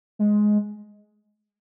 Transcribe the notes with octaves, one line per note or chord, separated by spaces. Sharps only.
G#3